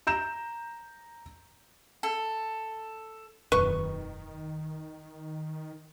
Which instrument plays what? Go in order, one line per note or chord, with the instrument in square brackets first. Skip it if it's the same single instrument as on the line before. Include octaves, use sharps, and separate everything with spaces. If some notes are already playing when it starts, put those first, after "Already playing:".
[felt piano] A#5 G6 E7
[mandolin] A4
[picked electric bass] E1 F#2 [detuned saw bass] D#3 [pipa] B4 C#6